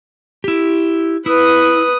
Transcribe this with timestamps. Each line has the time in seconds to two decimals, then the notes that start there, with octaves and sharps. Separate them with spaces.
0.44 E4 G4
1.26 E4 B4 D#6